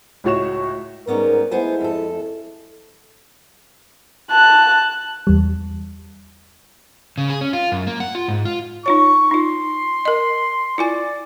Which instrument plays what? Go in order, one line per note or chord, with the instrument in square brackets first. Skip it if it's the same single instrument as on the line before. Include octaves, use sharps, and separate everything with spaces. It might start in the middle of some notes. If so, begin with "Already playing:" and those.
[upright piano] C#2 A2 F#4 C#5 C#6 E7
[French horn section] G#2 A#4 [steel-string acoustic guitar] G3 B3 C#4
[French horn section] G#3 A3 E4 [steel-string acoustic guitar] B3 C5 G#5
[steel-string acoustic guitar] F2 A4
[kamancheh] A5 F#6
[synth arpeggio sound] E2 G3
[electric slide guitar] C#3
G#4
C#4
F4
F#2
A#3
F#5
F4
G#2
F4
[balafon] D#4 F4 C#5 [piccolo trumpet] C#6
[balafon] D#4 F4 [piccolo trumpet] C6
[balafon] A#4 D#5
[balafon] E4 F4 G#5 [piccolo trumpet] D5